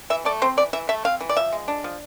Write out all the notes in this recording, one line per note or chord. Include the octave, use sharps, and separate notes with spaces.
E3 E5
A3 D5
C4 C5
E3 D5
E3 E5
A3 E5
C4 F5
E3
D5
F3 E5
G#3
D4
F3